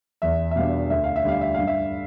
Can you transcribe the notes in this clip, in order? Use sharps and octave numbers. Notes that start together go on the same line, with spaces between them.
E2 E5
E5
B2 G3 B3 D4 F5
D2 E5
F5
E5
D3 G3 F5
E5
G2 F5
E5